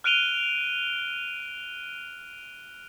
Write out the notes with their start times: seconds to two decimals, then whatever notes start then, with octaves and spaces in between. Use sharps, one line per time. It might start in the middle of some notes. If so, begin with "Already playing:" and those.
0.04 F6 F#6 D7 D#7 F7 G7